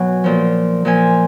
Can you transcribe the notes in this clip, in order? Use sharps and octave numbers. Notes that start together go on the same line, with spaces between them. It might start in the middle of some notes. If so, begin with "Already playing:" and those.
Already playing: B2 F#3 F#5 G#5
A#2 F3
A#2 F3 G#5